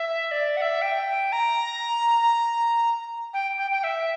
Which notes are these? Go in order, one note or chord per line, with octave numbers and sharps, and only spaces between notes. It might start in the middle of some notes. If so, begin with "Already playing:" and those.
Already playing: E5
D5
F#5
E5
G5
A#5
G5
G5
G5
E5